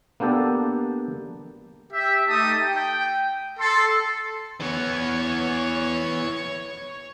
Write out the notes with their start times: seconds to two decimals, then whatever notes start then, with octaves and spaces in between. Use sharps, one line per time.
0.20 A#3 B3 D4 G4 A4
1.92 G4 E5
2.27 A3 D#4 G4 A5 D#6
2.61 G5
3.59 A4 C6
4.61 E3 B3 C#5